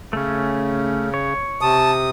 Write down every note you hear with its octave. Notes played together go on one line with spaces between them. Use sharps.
C#3 A3 C#4
C#5
C3 A5 D#6